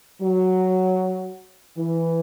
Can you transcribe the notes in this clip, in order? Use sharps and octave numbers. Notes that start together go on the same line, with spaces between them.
F#3
E3